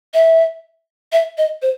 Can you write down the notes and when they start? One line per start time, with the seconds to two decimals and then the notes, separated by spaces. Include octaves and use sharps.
0.14 E5
1.12 E5
1.38 D#5
1.62 C5